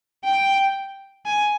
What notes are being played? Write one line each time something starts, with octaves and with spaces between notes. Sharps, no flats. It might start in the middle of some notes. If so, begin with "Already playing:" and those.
G5
G#5